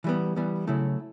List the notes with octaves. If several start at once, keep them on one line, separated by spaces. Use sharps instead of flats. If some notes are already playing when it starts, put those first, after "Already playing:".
E3 G3 B3
E3 G3 B3
C#3 F#3 A3 E4